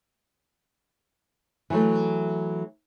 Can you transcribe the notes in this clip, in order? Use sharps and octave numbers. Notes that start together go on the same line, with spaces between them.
E3 F#3 A3